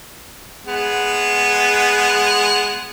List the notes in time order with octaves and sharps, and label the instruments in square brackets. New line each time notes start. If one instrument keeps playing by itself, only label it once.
[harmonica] G#3 B3